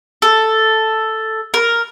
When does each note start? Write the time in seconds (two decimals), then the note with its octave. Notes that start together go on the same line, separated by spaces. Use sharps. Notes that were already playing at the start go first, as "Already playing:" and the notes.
0.22 A4
1.54 A#4